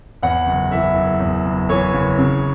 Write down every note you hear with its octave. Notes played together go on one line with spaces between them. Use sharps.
E2 F#5
F#1
E3 E5
F#1
E2
F#1
E3 C#5
F#1
C#3